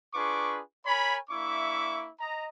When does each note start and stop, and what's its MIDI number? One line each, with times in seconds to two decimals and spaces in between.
0.14 0.60 62
0.14 0.60 65
0.14 0.60 68
0.14 0.60 71
0.14 0.60 85
0.14 0.60 86
0.86 1.16 70
0.86 1.16 73
0.86 1.16 80
0.86 1.16 83
1.30 2.09 58
1.30 2.09 62
1.30 2.09 64
1.30 2.09 76
1.30 2.09 85
1.30 2.09 86
2.20 2.48 75
2.20 2.48 82